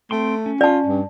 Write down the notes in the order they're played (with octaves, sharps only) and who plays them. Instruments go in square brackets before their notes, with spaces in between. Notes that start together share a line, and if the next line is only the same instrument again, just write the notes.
[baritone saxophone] A3 [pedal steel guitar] C4 G5 C6
[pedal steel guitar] C#4
[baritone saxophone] F4 [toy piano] D5 A5
[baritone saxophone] G2